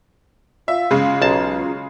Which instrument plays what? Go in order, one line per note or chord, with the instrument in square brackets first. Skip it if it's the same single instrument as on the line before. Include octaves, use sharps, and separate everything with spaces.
[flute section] F4 F5 [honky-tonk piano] E5
[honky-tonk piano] C#3 G#3
[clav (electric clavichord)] B1 A5 [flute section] C#4 F4 A#5